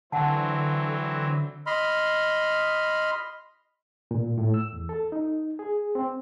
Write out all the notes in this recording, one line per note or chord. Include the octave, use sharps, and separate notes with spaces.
D3 E3 F#3 C4 F#5 A5
D#5 B5 C6 F6
A#2
A2
E6
E2
A4
D#4
G#4
C4